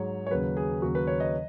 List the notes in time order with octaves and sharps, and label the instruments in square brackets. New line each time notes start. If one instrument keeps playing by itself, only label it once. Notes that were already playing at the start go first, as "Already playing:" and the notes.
Already playing: [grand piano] G#2 F#3 C#5
C#5
D#2 C#3 F#3 B4
G#4
D#2 C#3 F#3 F#4
B4
C#5
D#5